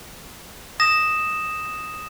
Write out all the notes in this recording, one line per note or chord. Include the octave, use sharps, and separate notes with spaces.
D#6 A#6 E7